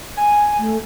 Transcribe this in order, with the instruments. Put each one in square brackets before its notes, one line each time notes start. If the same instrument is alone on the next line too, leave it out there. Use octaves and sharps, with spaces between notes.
[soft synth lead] G#5
[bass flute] A3